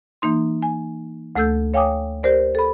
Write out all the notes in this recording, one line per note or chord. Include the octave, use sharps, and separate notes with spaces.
E3 A#3 D#4 C6
G#5
D2 A3 A4 E6 G6
C#5 F5 G5 G#5 D6 D#6
G4 A#4 C5 D5
A4 B5